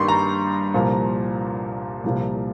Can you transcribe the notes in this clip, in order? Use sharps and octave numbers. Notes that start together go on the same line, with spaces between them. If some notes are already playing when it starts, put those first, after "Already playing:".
Already playing: G2 D#3 G3 A#3 C6 C#6
A#5
C2 A#2 F3
C2 A#2 F3